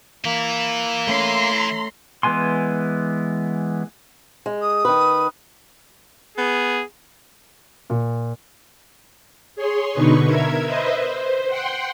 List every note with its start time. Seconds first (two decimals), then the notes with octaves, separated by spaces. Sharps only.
0.25 E3 A#3 E4
1.07 A3 C#4 A#5 C6
2.23 E3 G#3 B3 G#5 C6
4.46 G#3
4.61 D#6
4.85 D#3 B4
6.38 B3 G#4
7.90 A#2
9.56 G#4 C#5 C6
9.93 B2 D3 D#4 B4 C#6
10.25 A#4 E5 G#6
10.64 B4 C5 D#5 E5
11.04 C5
11.48 F#5 G5 C6